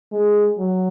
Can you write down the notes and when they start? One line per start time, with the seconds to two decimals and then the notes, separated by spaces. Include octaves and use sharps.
0.12 G#3
0.58 F#3